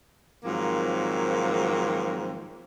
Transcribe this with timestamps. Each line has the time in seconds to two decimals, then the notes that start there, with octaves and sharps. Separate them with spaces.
0.44 G#2 D#3 F3 F#3 A#3 C4